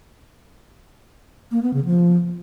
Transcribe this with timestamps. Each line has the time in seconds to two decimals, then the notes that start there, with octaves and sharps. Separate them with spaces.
1.52 A#3
1.63 B3
1.74 C#3
1.85 F3